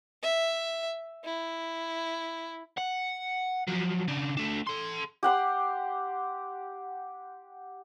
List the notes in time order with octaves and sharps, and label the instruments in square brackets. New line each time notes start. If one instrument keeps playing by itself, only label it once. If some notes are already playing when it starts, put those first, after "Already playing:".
[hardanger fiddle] E5
E4
[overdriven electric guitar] F#5
F3 F#3
C#3 D4
A3 D4
A4 C6
[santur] G4 F#5 C6